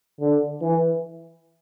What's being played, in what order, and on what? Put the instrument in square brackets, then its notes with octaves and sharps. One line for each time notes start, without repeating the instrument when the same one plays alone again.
[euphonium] D3
E3